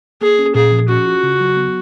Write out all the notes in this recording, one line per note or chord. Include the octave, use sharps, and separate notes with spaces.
A#3 G#4
C#4
A#2 G#4
F3
C#4 F#4
F4
C#3
F#3
B3